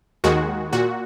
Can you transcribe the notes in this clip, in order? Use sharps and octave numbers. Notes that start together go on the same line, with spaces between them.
D#2 D#3 G#3 F#4
A#2 F#4